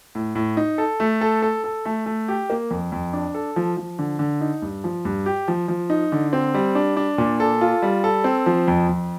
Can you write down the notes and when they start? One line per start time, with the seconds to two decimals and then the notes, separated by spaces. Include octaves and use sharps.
0.15 A2
0.35 A2
0.57 D#4
0.78 A4
1.00 A3
1.21 A4
1.42 A4
1.64 A4
1.85 A3
2.06 A3
2.28 G4
2.50 A#3
2.71 F2
2.92 F2
3.13 D4
3.34 A4
3.56 F3
3.77 F3
3.99 D3
4.19 D3
4.41 D#4
4.62 G2
4.84 F3
5.05 G2
5.26 G4
5.48 F3
5.68 F3
5.90 D#4
6.12 D3
6.33 C4
6.54 G3
6.75 D4
6.97 D4
7.18 A#2
7.40 A4
7.61 F4
7.82 G3
8.04 A4
8.24 C4
8.46 F3
8.68 F2
8.89 F2